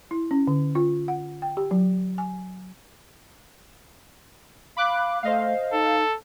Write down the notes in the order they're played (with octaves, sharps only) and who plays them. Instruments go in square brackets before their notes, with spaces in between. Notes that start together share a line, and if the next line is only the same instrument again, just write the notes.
[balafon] E4
C#4
D3
F4
F#5
G5
G4
F#3
G#5
[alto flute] F5 [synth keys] B5 D6 F#6
[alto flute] A3 [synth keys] C5 D#5 F5
[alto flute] D#4 [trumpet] A4